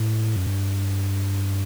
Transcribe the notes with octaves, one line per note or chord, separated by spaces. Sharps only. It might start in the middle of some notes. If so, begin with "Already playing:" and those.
Already playing: A2
F#2
G2